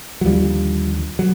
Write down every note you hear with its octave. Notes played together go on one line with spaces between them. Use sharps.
F#3
D#2 D3 F3 G3
F#3